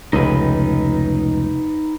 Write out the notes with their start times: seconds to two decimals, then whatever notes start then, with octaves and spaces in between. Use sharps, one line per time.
0.13 F1 C#2 D#4 B4